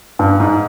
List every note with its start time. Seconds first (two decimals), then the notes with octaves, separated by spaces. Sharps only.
0.19 G2
0.40 G#2